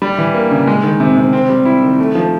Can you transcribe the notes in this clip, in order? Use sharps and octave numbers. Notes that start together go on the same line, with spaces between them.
G3
E3
A#3
C#3
G#3
D#3
C3
C3
C4
G3
E4
D#3
A3
F3